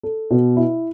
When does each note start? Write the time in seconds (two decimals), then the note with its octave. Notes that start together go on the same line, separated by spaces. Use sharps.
0.03 A4
0.31 B2
0.56 E4